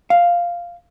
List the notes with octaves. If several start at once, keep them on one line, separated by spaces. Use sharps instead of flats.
F5